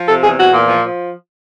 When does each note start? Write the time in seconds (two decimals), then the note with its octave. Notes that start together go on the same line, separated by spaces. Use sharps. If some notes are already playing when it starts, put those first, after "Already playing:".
Already playing: F3
0.08 C3 A4
0.23 E2 G#4
0.38 E2 F#4
0.53 A#2
0.68 F3
0.84 F3